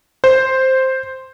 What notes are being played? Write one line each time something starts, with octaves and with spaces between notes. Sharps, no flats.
C5